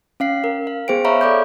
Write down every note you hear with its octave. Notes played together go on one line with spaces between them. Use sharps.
C#4 F5 C7
A#4
F5
B3 G#4 C5 G5 D7
C#5 E5 F5 A#5 B5 C#6
A4 D5 D6 G6